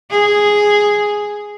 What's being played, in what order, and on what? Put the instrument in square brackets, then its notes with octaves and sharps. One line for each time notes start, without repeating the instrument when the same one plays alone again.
[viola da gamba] G#4